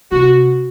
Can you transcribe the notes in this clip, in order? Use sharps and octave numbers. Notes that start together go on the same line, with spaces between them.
C3 F#4